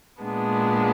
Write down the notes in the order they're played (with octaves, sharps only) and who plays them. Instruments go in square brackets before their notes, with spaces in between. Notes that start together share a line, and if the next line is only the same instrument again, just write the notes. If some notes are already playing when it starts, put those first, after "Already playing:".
[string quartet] A#2 G#3 B3 D4